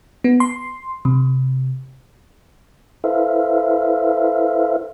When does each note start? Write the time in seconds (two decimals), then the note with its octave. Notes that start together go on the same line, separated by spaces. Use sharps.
0.24 B3
0.40 C6
1.05 C3
3.04 E4 A4 B4 C5 E5 F5